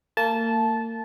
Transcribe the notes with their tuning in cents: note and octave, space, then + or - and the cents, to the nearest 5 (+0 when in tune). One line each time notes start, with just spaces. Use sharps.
A#3 -35 A5 -15